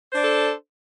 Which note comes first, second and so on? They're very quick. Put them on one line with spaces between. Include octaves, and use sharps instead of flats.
C5 D4 D5 A4